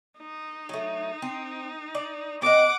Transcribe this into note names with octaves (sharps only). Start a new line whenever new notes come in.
D#4
F#3 A3
C4
D5
C4 D#4 F#5 D6